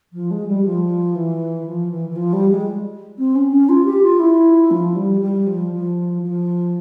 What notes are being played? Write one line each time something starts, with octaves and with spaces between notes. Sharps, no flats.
F3
G#3
G3
F3
E3
F3
E3
E3
F3
G3
G#3
C4
C#4
C#4
F4
G4
F4
E4
F3
G3
G3
F3
F3
F3